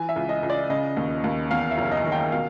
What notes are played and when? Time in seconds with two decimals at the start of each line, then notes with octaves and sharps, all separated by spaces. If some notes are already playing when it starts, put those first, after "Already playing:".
Already playing: E3 G#5
0.09 E5
0.16 C#2
0.29 D#5
0.43 C#2
0.50 D5
0.70 C#3 D#5
0.97 D#2
1.24 D#2
1.51 E2 F5
1.71 E5
1.78 F#1
1.91 D#5
2.04 D#3
2.12 G5
2.32 B2 F5